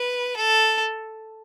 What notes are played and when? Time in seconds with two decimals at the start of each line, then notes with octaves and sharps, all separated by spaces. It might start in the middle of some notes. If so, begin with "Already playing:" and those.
Already playing: B4
0.36 A4